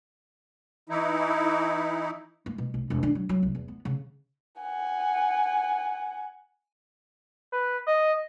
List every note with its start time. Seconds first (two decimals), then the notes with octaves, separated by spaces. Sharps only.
0.89 E3 D#4 E4
2.46 A#3
2.58 B2
2.74 B1
2.90 E1
3.03 D3
3.15 F#3
3.29 F#3
3.42 C2
3.55 E2
3.68 B3
3.85 C#3
4.61 F#5 G#5
7.53 B4
7.87 D#5